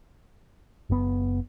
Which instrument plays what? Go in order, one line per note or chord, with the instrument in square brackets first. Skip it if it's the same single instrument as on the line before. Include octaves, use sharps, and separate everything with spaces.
[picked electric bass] F#1 B3